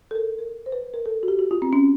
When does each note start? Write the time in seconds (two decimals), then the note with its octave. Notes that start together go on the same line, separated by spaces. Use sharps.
0.11 A4
0.15 A#4
0.39 A#4
0.66 C5
0.72 B4
0.94 A#4
1.06 A4
1.23 F#4
1.28 G4
1.39 F#4
1.51 F4
1.62 C4
1.73 C#4